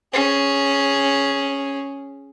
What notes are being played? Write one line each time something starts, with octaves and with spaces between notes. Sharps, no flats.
C#4 G#4